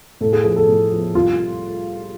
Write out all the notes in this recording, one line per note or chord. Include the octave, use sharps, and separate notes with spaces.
A2 A4
G#4
F3 B3 G#4
A4
A2
F3 B3
C2 F4